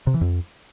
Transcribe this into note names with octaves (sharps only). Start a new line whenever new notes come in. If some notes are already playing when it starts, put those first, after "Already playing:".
C3
E3
F2